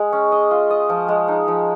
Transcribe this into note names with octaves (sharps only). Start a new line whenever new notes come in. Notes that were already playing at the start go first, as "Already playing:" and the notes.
Already playing: G#3
C#4
D#5
F4
D#5
F3
G#3
D#4
F3